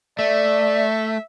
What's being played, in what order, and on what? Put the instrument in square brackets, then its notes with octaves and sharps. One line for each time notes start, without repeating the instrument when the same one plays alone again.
[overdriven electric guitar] A3 [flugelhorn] D5 [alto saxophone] E5